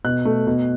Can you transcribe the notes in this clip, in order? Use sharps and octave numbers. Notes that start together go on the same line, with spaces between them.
B2 F#6
A3
B2